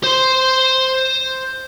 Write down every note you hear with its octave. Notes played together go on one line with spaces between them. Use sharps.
C5 C6